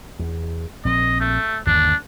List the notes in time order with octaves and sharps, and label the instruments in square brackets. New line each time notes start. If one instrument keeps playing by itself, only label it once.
[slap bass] E2
[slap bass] A#1 C4 [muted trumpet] D#5
[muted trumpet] A3
[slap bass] G1 D#2 A#3 [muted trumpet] D4